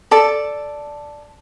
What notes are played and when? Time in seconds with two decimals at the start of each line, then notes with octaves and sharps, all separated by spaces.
0.11 A4 D5 A5